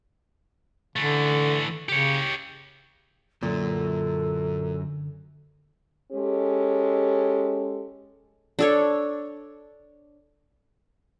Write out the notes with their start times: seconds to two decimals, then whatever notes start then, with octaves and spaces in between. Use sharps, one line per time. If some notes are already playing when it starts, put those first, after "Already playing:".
0.96 D3 E3 A3
1.89 C#3 G4 C#5
3.43 F#2 A#2 D3 A4
6.12 G#3 C#4 G4 A4
8.59 D4 A4 C#5